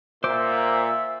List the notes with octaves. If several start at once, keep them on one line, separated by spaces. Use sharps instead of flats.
A#2 C5 E5 D6